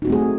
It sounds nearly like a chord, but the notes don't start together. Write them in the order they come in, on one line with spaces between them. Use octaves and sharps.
D#4 F#4 C4 A3 G#4